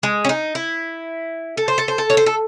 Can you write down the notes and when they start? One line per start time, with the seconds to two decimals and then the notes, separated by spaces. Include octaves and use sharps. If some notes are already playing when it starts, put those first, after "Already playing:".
0.03 G#3
0.25 C#4
0.29 D#4
0.55 E4
1.57 A4
1.68 C5
1.78 A4
1.88 C5
1.98 A4
2.10 C#5
2.17 C5
2.26 A4